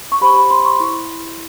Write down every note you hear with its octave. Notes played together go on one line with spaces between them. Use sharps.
C#6
G4 C5 B5
B5
C6
C#6
E4